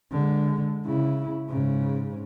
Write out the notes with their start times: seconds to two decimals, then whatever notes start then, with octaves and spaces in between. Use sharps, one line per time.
0.11 D3 G#3
0.85 C#3 E4
1.49 G#2 C#3